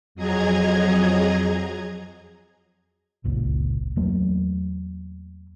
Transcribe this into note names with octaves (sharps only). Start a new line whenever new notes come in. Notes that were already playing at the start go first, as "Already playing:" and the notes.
F2 F#3 G#4 D#5 A#5 G#6
G1 C#2 A#2
E2 F#3 A3 A#3